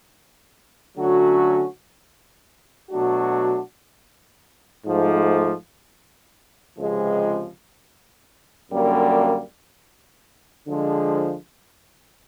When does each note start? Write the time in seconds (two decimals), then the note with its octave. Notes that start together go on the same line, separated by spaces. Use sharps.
0.97 D3 F#3 A3 C#4 F#4
2.90 B2 F#3 A3 D4 F#4
4.85 G#2 F3 A3
6.78 C#2 C3 F3 G#3
8.72 F#2 D3 G3 A#3
10.66 D3 F3 G#3